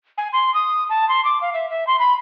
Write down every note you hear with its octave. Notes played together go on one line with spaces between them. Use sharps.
G#5
C6
D#6
A5
C6
D6
F5
E5
E5
C6
B5